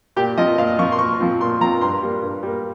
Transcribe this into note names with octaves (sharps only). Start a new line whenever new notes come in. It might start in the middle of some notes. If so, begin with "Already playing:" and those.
A#2 G4
F3 C4 F4 D#5
A#2 F5
F3 C4 F4 C#6
C6
A#2 C#6
F3 C4 F4
A#2 C6
F3 C4 F4 A#5
G2 C6
G3 A#3
G2
G3 A#3